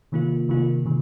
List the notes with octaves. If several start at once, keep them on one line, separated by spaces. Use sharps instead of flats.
C3 D#3 A#3 F4
C3 D#3 A#3 F4
C3 D#3